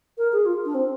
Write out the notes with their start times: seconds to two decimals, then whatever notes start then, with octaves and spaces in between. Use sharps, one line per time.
0.18 A#4
0.32 G#4
0.45 F4
0.65 D4
0.74 C4